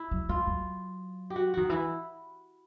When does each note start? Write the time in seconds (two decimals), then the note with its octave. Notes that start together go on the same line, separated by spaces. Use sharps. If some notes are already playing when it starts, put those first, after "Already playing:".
Already playing: E4
0.11 F#3
0.29 F#3 F4
0.47 F#3
1.30 G4
1.36 F#4
1.54 D#3 F#4
1.69 E3 E4